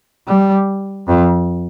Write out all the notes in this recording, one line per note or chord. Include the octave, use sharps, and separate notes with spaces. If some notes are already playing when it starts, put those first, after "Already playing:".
G3
F2